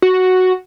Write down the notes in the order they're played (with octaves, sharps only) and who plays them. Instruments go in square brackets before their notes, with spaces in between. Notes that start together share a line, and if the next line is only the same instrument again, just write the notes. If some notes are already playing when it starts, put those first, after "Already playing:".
[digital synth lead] F#4